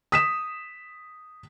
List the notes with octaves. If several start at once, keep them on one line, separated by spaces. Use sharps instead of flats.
D#6 B6 E7